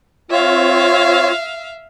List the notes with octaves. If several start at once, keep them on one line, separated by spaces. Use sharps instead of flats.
C4 F4 C#5 E5 F5